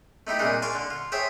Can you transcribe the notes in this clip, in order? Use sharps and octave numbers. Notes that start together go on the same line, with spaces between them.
A3 D#4 E4 G4
C2 A#2 D4 D#4 G#4
D5 F5 G#5 C6 C#6
D3
F4
G#4 C5 C#5 E5 G5 A5